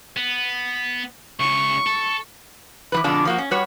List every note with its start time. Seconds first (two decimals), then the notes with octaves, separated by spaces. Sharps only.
0.17 B3
1.40 C#2 C#3 C#6
1.87 A4
2.92 E3 G3 B4
3.04 F2 B2 D3 G#3 D4 F4
3.25 F3 A#3 F#4
3.38 C#4
3.51 G3 F#4 B4 C#5